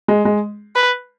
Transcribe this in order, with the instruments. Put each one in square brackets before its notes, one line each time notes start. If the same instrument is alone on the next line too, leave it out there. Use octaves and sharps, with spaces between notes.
[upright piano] G#3
G#3
[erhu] B4